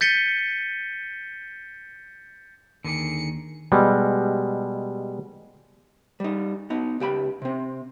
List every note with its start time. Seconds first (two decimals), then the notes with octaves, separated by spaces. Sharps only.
0.01 G6 A6 B6 C#7 D#7 G7
2.85 D#2 D3 D#3 G#4 C#7
3.72 B2 G3 G#3
6.20 G3 D#4
6.70 B3 D#4
7.00 C#2 G4 G5 B5
7.42 C3 C4